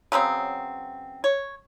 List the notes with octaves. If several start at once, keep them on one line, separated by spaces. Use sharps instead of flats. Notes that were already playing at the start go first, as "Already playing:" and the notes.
C#3 F#3 B3 C4
C#5